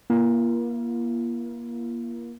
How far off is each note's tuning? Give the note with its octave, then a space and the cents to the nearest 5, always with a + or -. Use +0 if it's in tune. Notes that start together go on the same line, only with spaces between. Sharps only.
A#3 +30 F4 -45